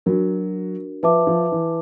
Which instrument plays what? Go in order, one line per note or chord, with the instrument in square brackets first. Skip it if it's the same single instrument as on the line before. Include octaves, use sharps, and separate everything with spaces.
[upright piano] F#3 [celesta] D4 F#4 A#4
[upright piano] F3 [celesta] B4 E5 A5 D6
[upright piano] F3
E3